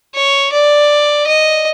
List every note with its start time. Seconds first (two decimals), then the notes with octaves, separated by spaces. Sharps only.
0.15 C#5
0.52 D5
1.27 D#5